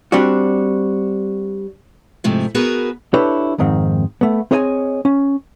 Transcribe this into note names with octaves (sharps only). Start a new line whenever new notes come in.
G3 C4 D4 F#4
G#2 C3 F3 A3
B3 F#4 G#4 A#4 B4
D4 E4 G4 A4 B4 C#5
F2 G#2 D#3 C4
A3 B3
C4 G#4 C#5 D#5 E5 G#5
C#4